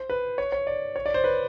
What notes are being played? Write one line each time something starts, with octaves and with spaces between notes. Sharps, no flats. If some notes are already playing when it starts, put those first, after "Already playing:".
Already playing: C5
B4
C#5
C#5
D5
C#5
D5
C5
B4